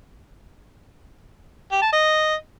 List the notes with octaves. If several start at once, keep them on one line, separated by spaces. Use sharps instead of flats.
G4
A5
D#5